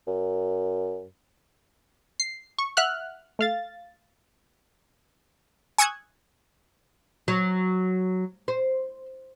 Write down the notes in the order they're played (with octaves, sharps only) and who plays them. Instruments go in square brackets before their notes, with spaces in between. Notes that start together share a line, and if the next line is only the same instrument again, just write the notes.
[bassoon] F#2
[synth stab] C7
C#6
E5 F#5 F6 F#6
A3 F5 A6
[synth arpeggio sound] G#5 C#6 D#6 E6 F#6 G#6
[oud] F#3
C5